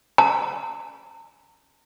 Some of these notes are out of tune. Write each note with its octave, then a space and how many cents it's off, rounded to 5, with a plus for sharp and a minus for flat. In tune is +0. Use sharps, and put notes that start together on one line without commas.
A#5 -40